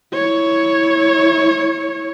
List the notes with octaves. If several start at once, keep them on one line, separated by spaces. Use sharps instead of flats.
E4 C#5